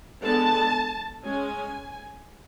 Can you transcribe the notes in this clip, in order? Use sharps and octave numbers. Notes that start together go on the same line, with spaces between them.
D3 G#3 B3 A5
G#3 C#4 G#5